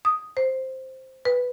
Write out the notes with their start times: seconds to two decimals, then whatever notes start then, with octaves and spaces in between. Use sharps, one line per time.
0.05 D#6
0.37 C5
1.25 B4